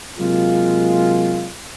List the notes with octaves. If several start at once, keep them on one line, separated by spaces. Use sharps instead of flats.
C3 F#3 G#3 A#3 F4